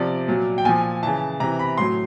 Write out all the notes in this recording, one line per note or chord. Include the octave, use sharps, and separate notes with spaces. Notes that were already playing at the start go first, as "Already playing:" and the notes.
Already playing: C3 F3 D5
A#2 F#3
G5
A#2 F3 G#5
C#3 E3 A5
C3 E3 A#5
B5
A2 F#3 C6